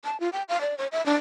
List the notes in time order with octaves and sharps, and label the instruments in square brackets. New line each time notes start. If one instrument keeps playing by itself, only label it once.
[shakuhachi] A5
F4
G5
F5
D5
C#5
E5
D4